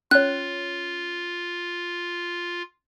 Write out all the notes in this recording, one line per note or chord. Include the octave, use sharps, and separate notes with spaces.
C#4 F4 C#5 F#6